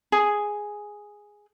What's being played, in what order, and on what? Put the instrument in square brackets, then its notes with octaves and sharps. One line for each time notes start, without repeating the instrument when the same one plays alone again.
[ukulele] G#4